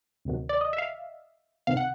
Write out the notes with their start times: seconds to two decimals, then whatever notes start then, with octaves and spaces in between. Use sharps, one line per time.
0.25 D2 C3 D#3 F#3
0.49 D5
0.61 D#5
0.73 E5
0.78 F5
1.67 C#2 C3 D#3 F5
1.77 F#5